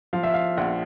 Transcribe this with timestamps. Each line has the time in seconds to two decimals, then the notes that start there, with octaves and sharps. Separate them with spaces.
0.13 F3 F5
0.23 E5
0.34 F5
0.57 A#1 F#5